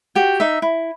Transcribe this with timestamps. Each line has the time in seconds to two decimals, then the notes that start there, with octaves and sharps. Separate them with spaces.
0.15 F#4 G4 G5
0.40 D#4 E5
0.62 E4